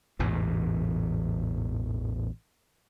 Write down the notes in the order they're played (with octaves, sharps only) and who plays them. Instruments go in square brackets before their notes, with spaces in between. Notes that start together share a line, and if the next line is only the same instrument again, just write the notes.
[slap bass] A1 E2 G#2 B2